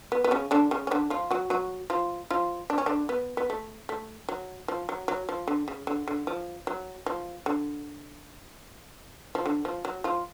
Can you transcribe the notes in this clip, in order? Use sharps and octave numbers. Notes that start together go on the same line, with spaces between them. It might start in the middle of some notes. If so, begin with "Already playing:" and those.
B3
B3
C#3 C#4
D3 D4
C#3 C#4
C#4
D3 D4
F3 F4
F#3 F#4
F#3 F#4
F3 F4
F3 F4
D4
C#4
D3 D4
B3
B3
A3
A3
F#3
F3
F#3
F#3
F3
D3
C#3
D3
D3
F3
F#3
F3
D3
F3
D3
F3
F#3
F3 F4